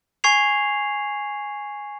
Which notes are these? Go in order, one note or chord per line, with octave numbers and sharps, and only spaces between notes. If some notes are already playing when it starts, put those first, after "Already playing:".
G#5 C#6 G#6 C7 F7